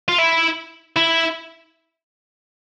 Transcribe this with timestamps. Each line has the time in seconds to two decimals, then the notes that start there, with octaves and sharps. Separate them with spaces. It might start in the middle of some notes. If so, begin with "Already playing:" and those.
0.09 F4
0.19 E4
0.97 E4